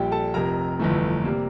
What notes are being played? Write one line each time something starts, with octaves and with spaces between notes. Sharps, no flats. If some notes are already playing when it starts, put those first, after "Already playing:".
Already playing: A#1 A#2 G3 G4 G5
A4 A5
F1 F2 C3 A#4 A#5
G1 F2 E3 A3
C3 G3 A#3